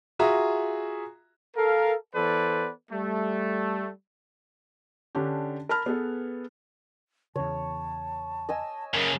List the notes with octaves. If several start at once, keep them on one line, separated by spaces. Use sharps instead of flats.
F4 F#4 G#4 E5 A#5 D#6
A4 A#4 F5
E3 B3 A4 B4 C5 D5
G3 A3
D3 C#4 D4 G4
A#4 A5 B5 F6
B3 G#4 A4 B4
E2 C#3 C#5 A5
D#5 G#5 E6
F#2 C#3 A#4